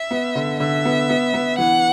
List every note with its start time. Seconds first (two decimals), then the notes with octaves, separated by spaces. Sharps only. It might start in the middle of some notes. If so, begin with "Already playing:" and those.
Already playing: E5
0.11 B3
0.35 D3
0.60 D3 E5
0.85 B3
1.10 B3
1.34 B3
1.58 E3 F#5